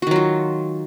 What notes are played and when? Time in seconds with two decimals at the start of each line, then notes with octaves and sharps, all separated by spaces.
0.02 F#4
0.07 D#3
0.11 F#3
0.16 F4